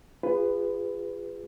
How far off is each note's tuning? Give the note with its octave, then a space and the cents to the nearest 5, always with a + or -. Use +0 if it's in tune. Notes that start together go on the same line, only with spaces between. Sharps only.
F4 +0 G#4 -25 B4 +15